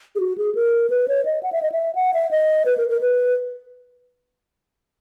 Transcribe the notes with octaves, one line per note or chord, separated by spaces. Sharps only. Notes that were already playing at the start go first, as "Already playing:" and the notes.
G#4
F#4
G#4
A#4
B4
C#5
D#5
F#5
E5
D#5
E5
F#5
E5
D#5
B4
A#4
A#4
B4